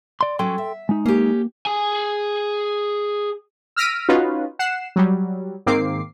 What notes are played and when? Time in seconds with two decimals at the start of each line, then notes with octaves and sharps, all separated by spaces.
0.21 D5 C6
0.39 F#3 C#4 A4 G5 C6
0.58 E5
0.89 G#3 D#4
1.06 A#3 C#4 G4
1.66 G#4 G#5
3.76 E6 F6 A#6 B6 D7 D#7
4.09 C#4 D#4 F4 F#4 B4
4.59 F#5 C7 E7
4.96 F#3 G3
5.66 G#2 D#3 A#3 C4 D6 C7